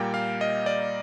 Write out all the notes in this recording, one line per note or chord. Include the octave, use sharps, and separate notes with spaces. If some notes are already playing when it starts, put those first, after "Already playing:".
Already playing: A#2 G3 A#3 G5
F5
D#5
D5